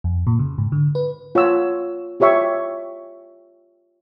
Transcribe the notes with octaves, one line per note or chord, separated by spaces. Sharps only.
F2
A#2
C#3
G#2
D3
B4
F4 C#5 F#5 E6
F4 G4 C#5 E5 C#6